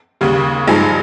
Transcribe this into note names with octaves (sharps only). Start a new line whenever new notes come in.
D#2 C#3 G3
G2 F3 G#3 D#4 G#4